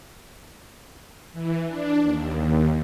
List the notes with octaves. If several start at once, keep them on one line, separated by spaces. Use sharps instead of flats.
E3
D4
D#2